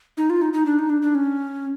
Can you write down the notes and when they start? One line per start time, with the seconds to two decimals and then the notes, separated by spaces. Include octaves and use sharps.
0.17 D#4
0.30 F4
0.42 D#4
0.53 D#4
0.66 D4
0.79 D#4
0.90 D4
1.02 D4
1.15 C#4